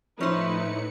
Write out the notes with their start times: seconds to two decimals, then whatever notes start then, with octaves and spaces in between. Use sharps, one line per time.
0.21 A2 F3 C#4 D#4 E4 B4 C5 C#7